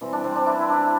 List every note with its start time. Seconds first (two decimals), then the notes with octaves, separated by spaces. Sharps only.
0.01 E3 G3 C4
0.13 D4
0.24 C4
0.35 D4
0.46 E4
0.59 E4
0.70 D4